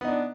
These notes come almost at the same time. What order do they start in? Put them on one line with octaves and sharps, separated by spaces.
B3 D#4 D4